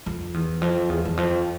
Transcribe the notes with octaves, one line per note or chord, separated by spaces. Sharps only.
F2
E2
F2
E2
E2
F2